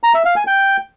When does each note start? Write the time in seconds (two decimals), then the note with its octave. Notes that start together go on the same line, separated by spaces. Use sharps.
0.03 A#5
0.14 E5
0.25 F5
0.36 G#5
0.47 G5